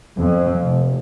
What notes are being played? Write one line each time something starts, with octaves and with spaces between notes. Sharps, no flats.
F2
F1